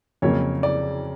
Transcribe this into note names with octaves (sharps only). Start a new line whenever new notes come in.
F2 C#3 F#3 A#3 C#5
D5